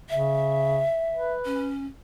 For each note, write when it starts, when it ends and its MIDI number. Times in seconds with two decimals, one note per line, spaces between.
0.10 0.84 49
0.10 1.33 76
1.13 1.69 71
1.46 1.86 61